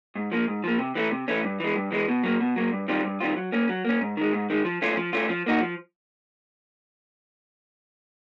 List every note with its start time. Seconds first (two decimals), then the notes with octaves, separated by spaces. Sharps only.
0.15 G#2
0.32 F3 A#3
0.48 G#2
0.64 F3 A#3
0.79 C3
0.95 E3 A3 C#4
1.11 C3
1.28 E3 A3 C#4
1.44 G2
1.60 E3 G#3
1.76 G2
1.92 E3 G#3
2.08 B2
2.23 F#3 A#3
2.40 B2
2.56 F#3 A#3
2.72 G2
2.88 D#3 G3 C4 F4
3.05 G2
3.20 D#3 G3 C4 F4
3.36 F#3
3.52 A#3 C#4
3.69 F#3
3.85 A#3 C#4
4.01 G#2
4.17 D#3 G#3
4.33 G#2
4.50 D#3 G#3
4.65 F3
4.82 A3 C#4 F4
4.97 F3
5.13 A3 C#4 F4
5.29 F3
5.46 A#3 D#4 F#4
5.61 F3